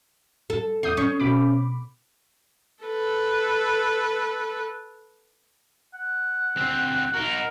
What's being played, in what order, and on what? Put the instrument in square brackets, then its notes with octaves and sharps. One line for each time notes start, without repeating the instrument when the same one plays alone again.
[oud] A4
[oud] E2 [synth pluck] D#6 G6 C7
[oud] C#4 [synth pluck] C#6
[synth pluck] B2 B5 D6
[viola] A4 B4
[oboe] F#5
[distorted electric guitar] D2 C4
[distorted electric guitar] D#4 F#4 [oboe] A#4